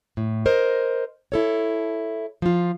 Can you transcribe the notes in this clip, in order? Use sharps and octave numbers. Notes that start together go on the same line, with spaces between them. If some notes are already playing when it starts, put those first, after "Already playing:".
A2
A#4 C5 D#5
E4 A4 C#5
F3 F4